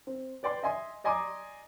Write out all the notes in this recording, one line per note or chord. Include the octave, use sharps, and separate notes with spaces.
C4
B4 D5 G5 C6
D#5 E5 G#5 C6
D5 D#5 G#5 A#5 C6 D6